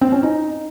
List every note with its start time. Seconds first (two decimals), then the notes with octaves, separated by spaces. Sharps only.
0.01 C4
0.12 C#4
0.23 D#4